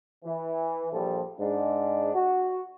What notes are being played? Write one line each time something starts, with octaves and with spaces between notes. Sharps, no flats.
E3
A#1 F3 G3 A4
G#2 D4
F#4